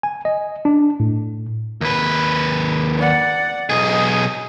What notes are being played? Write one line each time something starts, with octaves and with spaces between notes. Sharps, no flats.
G#5
D#5
D4
A2
D#2 B4
D5 F#5
B1 G#4 D#5